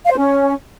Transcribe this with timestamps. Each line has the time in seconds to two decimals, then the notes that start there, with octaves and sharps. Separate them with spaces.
0.05 F5
0.11 C5
0.16 C#4